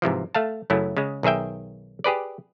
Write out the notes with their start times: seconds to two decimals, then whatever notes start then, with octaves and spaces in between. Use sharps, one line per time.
0.02 G#2 C3 E3 F3
0.35 A3 F5 A5
0.70 F#2 C#3 F#3 A3 E4
0.97 C#3 G#3
1.23 B1 D#3 G#4 E5 G5
2.04 G4 G#4 B4 D5